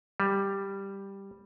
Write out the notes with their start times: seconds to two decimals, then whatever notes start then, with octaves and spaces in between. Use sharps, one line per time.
0.20 G3